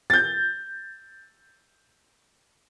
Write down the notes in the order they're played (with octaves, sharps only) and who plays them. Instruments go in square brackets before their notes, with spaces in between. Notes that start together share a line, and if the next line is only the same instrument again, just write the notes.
[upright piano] G6 A6